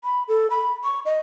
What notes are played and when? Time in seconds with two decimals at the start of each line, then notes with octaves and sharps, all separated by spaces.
0.04 B5
0.28 A4
0.50 B5
0.84 C#6
1.05 D#5